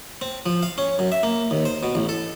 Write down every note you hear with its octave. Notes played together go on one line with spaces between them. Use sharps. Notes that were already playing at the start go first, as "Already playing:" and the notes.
C4
F3
F5
C#4
F#2
E5
A#3
D#2
C5
B2
A1
A4